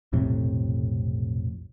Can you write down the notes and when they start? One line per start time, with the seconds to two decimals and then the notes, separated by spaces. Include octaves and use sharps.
0.13 B1 F2 A2 C3